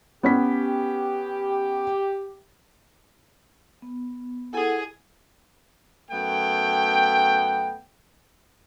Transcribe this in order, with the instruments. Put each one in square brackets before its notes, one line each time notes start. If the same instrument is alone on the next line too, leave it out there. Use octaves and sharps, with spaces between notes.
[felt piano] B3 C#4 B6 [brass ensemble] G4
[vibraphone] B3
[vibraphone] E4 A4 F#5 [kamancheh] G#4 G#5
[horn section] F#2 A3 B3 G5